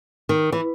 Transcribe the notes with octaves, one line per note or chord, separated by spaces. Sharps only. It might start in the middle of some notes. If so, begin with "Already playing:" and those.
D#3
E3